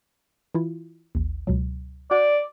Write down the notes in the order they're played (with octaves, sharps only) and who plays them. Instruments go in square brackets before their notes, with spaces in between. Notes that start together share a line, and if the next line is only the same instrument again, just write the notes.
[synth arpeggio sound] E3 E4 F4
A1 D#2
C#2 B2 F#3
[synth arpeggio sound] F#4 F#5 G6 [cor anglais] D5